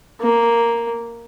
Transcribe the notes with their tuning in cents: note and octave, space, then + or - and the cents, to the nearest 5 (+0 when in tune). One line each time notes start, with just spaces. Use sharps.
A#3 +0